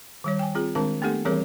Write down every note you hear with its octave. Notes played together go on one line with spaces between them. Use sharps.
D#3 G3 C#5
G5 G#5
C4 F4 G#4
D#3 G#3 C4 D4 A#4 A5
A3 B3 D4 G4 A4 F#5
E3 G3 C4 G#4 A#4 C#5